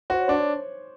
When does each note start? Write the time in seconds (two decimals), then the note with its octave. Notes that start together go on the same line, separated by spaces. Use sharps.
0.10 F#4 C5
0.19 C#5
0.28 D4 C5
0.37 C#5